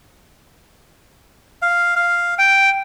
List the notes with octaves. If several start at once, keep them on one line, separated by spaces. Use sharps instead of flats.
F5
F5
G5